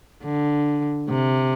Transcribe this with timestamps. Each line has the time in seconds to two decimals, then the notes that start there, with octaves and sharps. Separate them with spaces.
0.24 D3
1.10 C3